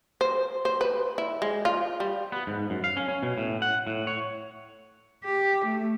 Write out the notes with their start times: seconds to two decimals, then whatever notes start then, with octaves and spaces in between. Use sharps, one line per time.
0.21 C5
0.65 C5
0.81 B4
1.18 E4
1.42 G#3
1.65 F4
2.00 G3
2.32 B3
2.47 G#2
2.70 F#2
2.84 F5
2.97 C#4
3.08 C#4
3.23 B2
3.38 A2
3.62 F#5
3.87 A2
4.07 C#5
5.24 G4
5.65 A3